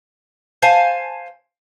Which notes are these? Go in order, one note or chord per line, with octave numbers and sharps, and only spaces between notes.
C5 F5 G#5 A5